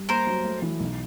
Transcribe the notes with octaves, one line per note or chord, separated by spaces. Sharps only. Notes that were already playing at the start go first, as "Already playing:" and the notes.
Already playing: G3
A#3 A#4 C5
F#3
A3
E3
B1